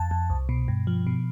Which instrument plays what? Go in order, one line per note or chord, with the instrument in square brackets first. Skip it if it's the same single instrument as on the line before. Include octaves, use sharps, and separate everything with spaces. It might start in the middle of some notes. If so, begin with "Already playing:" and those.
Already playing: [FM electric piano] F2 A5
F2
C2
B2
G2
F3
B2